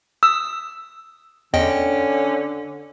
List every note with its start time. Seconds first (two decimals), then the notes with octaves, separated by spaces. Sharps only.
0.23 D#6 E6
1.54 E2 D3 C#4 D#5 G5